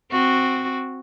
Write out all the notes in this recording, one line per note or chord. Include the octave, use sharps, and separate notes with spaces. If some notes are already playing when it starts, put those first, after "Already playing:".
C4 F#4